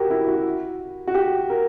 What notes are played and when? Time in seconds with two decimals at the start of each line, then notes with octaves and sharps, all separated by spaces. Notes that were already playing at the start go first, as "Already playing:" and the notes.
Already playing: F#4 G4 A#4
0.10 E4
0.27 F#4
1.08 F#4
1.15 G4
1.50 A#4